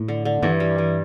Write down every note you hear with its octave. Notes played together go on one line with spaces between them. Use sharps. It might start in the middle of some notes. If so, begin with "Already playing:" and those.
Already playing: A2
D3
D3
G2 E3
G3
E3